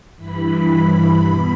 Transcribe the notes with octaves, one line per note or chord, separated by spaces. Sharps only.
G2 E3 B5
G2 E3 B5
E2 B2 B5